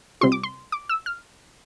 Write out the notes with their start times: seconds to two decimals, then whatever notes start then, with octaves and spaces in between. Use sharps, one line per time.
0.21 C3 G3 C4 F4 C6
0.32 D6
0.43 C6
0.72 D6
0.89 E6
1.06 F6